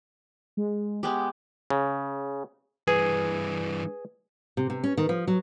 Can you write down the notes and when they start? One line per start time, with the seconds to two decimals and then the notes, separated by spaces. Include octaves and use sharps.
0.57 G#3
1.03 G#3 B3 G4
1.70 C#3
2.88 G2 E3 G#4 B4
4.57 C3
4.70 C3
4.84 C#4
4.98 D#3
5.09 F3
5.28 F#3